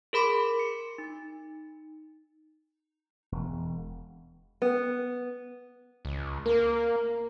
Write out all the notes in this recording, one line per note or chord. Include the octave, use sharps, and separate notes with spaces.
G#4 A#4 B5 C6 D6
C#7
D#4
E1
B3
C#2
A#3 A#4